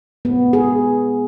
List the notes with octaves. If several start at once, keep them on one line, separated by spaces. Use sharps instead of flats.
B3
G#4